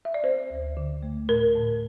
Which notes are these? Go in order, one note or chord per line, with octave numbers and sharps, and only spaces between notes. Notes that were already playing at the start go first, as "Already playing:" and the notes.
E5
D5
C4 C5
D2
D3
A3
A2 A#4
A2